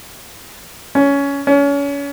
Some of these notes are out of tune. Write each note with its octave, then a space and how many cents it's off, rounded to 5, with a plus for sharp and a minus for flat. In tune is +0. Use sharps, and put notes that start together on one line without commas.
C#4 +15
C#4 +30